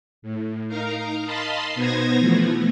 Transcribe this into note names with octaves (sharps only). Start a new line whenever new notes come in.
A2
D#4 A#4 F5 A#5
D#5 F5 A5 B5 C6
B2 B3 D#4 C5 G#6 A#6
E3 F3 A3 B3